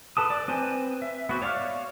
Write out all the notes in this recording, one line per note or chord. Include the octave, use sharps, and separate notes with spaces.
A4 B4 A5 D#6
D5
C4 B4 C5 G#5
E5
B3 F#4 C5
C#5 D5 F5 C#6 F6